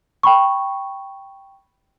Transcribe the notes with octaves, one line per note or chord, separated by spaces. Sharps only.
G5 B5 C#6